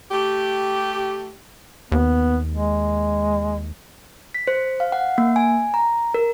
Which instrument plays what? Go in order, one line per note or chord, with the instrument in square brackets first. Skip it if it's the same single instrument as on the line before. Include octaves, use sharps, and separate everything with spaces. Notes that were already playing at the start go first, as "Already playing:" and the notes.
[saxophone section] A3 G4
[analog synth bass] D#2 [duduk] B3
[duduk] G#3
[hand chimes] B6
C5
F5
F#5
A#3
G#5
A#5
A#4